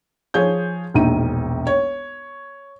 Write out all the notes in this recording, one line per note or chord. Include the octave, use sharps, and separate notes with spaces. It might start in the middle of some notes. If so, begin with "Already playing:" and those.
F3 G#4 C#5 G6
E1 A#1 D#4 D#7
C#5